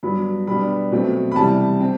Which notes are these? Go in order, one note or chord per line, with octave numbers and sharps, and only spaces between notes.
G2 F#3 B3 B5
B2 G3 B3 D4 B5
B2 F#3 A3 C4
B5
E2 C3 G3 A5
C4